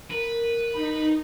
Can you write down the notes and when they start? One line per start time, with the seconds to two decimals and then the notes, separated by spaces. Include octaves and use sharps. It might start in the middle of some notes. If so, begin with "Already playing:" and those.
0.11 A#4 B4
0.74 D#4 B5